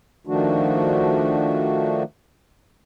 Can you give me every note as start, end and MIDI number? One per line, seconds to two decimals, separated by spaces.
0.27 2.03 51
0.27 2.03 53
0.27 2.03 57
0.27 2.03 62
0.27 2.03 66